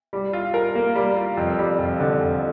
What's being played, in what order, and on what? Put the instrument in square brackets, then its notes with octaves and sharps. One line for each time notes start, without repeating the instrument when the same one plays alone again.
[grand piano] G3
F4
A#4
A#3
G3
F4
F2
G3
F2
D3
F2